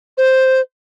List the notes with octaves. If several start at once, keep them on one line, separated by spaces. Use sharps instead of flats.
C5